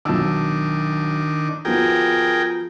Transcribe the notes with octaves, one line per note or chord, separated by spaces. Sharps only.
B1 D#3 D4 A5 E6
F3 B3 F#4 G#4 A#4 G5